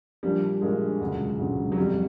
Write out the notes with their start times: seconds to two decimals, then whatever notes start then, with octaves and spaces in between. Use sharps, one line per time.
0.23 A#1 A#2 F3 G3 A#3 D4
0.61 A#1 A#2 F3 G#3 A#3 D4
1.01 E1 D2 C#3 F#3
1.38 E1 D2 C#3 F#3
1.72 F#3
1.77 F1 F2 C3 G3